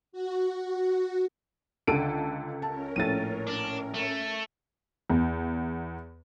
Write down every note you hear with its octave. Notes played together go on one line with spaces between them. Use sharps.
F#4
C#2 D3 A4 D7 D#7
C#4 A#4 A5
A#1 A2 A4 A6 D#7
D4
A3
E2